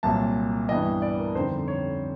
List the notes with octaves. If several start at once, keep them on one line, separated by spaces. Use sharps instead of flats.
C2 A#2 F#3 A5
G2 E3 G3 B3 D#5
D5
A#4
F2 D3 G3 C4 D#4 C5
C#5